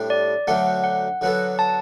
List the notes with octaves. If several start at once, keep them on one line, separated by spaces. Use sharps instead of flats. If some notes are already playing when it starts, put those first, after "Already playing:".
Already playing: A2 G3 D4
D5
D2 D3 F#3 A3 D4 F#5
F#5
D3 F#3 B3 F#4 A4
A5